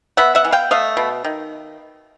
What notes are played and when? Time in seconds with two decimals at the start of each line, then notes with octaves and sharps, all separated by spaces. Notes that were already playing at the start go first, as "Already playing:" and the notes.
0.17 B3 E5 F#5
0.35 E5 F#5
0.45 E3
0.52 F5 G5
0.71 A3 D#5 F5
0.97 B2
1.24 D#3